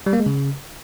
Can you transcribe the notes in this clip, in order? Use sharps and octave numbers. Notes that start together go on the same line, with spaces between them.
G3
A#3
G#3
C#3